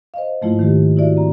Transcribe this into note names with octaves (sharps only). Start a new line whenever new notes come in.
C5 D#5 F5
G#2 F3 A3 A#3 E4 F4
D#3 A3 G4
E4 F#4 D5 E5
C4 A#5